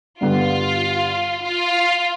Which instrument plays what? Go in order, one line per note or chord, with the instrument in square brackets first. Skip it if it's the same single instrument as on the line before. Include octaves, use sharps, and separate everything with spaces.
[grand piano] G2 D3 G3 B3 [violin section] F4
[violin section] F4